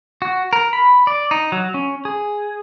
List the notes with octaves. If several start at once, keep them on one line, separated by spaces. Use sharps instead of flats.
F#4
A#4
B5
D5
D#4
F#3
C#4
G#4